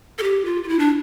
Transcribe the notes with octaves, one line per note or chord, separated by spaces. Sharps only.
A4
G4
F4
F4
E4
D4